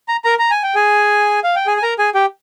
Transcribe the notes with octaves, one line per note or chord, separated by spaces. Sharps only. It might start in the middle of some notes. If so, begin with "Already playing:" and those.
A#5
A#4 A#5
A#5
G#5
G5
G#4 G#5
F5
G5
G#4 G#5
G#5
A#4 A#5
G#4 G#5
G4 G5